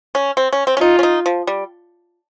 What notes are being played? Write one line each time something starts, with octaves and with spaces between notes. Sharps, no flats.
C#4
C4
C#4
C4
C#4
D#4 F4
C#4
D#4
F3
G3